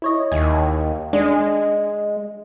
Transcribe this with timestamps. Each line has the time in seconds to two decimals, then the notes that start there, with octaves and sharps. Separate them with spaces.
0.02 E4 C#5 D#5
0.32 D#2 G#5
1.13 G#3 D4